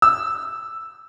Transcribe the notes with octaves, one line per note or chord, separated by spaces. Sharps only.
E6